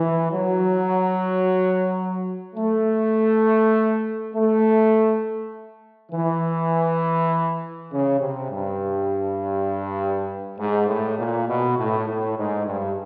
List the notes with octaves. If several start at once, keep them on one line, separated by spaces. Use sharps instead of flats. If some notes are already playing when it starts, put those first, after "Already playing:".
Already playing: E3
F#3
A3
A3
E3
C#3
C3
G2
G#2
A2
A#2
B2
A2
A2
G#2
G2